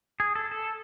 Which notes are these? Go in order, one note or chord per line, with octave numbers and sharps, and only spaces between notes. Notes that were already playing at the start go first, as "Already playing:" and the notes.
G#4
A4
A4